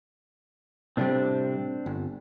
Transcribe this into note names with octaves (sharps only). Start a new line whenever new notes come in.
A2 C3 G3 C4 D4
G1